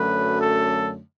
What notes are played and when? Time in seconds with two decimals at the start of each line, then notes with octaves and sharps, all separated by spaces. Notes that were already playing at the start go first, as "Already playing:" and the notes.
Already playing: F#2 D3 F#3 A3 B4
0.41 A4